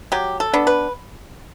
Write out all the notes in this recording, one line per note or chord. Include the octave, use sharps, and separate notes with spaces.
F#3 G4
A4
B3 D4
B4